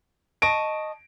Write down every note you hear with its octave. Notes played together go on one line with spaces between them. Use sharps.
D#5 A5 C#6 D7